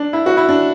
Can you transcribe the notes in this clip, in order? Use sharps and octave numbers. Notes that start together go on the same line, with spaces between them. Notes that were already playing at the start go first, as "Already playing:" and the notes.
Already playing: D4
E4
F#4
E4
D4